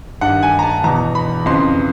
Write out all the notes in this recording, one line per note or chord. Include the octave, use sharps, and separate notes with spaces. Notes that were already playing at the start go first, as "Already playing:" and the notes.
G2 D#3 F#5
G#5
A#5
A5
E2 B2 A#5
B5
F2 C#3 E3 C6